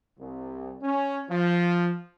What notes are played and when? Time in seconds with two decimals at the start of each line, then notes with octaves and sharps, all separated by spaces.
0.19 C2
0.82 C#4
1.30 F3